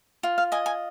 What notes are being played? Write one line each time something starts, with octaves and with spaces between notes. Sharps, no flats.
F4
F5
D#5 G#5
G#5